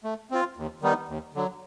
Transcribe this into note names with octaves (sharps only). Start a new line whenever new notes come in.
A3
C4 F4
D#2
D#3 G3 B3 D#4
D#2
D3 F#3